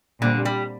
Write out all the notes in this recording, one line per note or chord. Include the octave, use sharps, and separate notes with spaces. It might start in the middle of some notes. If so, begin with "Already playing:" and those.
A#2 D3 G3 C4
G3